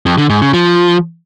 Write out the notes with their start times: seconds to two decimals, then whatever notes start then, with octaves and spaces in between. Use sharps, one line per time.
0.06 F2
0.18 D3
0.30 G#2
0.42 C#3
0.54 F3